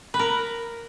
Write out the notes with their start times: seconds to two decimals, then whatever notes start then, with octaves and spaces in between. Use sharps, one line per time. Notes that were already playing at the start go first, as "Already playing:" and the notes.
0.14 B4
0.19 A#4